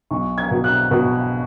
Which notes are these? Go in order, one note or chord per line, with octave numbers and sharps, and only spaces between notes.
B1 C#6
G#6
B2
F#6
B2